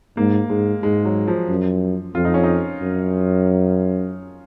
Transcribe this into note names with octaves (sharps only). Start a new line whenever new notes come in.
G#2 A#3
G#2 G#3
G#2 G#3
F#3
F3
F#2
F2 F4
D#4
C#4
D#4
F#2